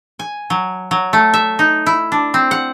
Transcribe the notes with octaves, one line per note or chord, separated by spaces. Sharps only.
G#5
F#3
F#3
A3
E5
D#4
E4
D4
C4
F#5